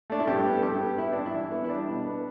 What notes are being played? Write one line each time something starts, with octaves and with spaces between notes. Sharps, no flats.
A3 D4
E4
G2 G4
B3
A4
G2 G4
B3
B3 E4
G2 D4
E4
E3
B3
E4
G3 D4
B2
B3